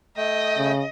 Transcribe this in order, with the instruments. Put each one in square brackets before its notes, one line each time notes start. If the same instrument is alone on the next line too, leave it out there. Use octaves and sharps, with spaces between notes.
[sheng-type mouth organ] A3 G5 [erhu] D#5
[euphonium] C#3